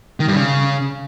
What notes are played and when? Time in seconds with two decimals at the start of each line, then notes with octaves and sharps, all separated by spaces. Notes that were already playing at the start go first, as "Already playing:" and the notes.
0.20 D#3
0.28 G2
0.36 C#3